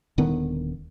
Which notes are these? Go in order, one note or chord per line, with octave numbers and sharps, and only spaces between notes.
D#1 D3 D#3 B3